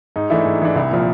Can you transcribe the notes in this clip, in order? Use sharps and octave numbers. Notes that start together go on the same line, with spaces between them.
G#2 D#4
E3 A3 D4 E4
G#2
E3 A3 D4
C2 E4
A#2 F3